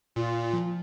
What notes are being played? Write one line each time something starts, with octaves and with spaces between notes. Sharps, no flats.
A#2 F4
F3